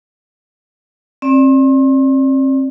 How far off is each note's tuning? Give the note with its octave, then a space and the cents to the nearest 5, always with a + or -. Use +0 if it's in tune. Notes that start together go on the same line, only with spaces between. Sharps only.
C4 +40 D5 +0